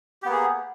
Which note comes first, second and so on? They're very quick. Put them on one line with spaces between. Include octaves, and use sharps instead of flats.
G4 B3 A#3 G#4